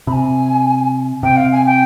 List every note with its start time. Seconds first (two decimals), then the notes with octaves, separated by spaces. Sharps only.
0.07 C3 B5
0.12 G#5
1.23 C3 G5
1.37 F5
1.52 G#5
1.66 G5